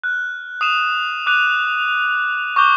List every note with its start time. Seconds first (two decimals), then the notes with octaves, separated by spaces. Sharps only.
0.04 F6 F#6
0.61 D#6 D#7 E7
1.26 D6 F#6 D#7 F7
2.56 C#6 D6 F#6 G6 G7